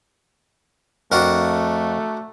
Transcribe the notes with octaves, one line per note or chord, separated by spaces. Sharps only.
F2 A3 D4 F#4 A#4